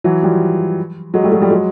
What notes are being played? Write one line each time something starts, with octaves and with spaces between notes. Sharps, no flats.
E3 F#3
F3 G3
F#3 G#3
G3 A3
F#3 G#3
F3 G3
F#3 G#3